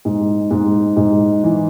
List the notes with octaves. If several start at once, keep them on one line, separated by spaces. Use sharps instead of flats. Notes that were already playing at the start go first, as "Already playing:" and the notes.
G#2
G#2
G#2
E3